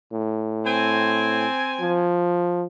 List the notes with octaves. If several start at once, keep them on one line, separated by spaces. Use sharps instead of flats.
A2
C4 G#5
F3